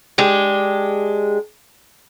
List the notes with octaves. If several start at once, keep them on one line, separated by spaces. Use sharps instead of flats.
G#3 D4 G4